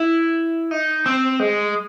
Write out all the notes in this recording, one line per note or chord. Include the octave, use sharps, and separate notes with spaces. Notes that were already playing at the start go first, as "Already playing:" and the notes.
Already playing: E4
D#4
C4
G#3